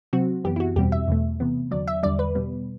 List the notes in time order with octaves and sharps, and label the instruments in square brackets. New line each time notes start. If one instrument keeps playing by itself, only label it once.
[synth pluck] C3 F#3 C4 F#4
F#2 E3 B3 G4
E4
F#4
E2 B2 G3 C4 G4
E5
E2 B2 A3
C3 E3 B3
E2 D3 F#3 D5
E5
E2 D3 G3 D5
B4
B2 G3 B3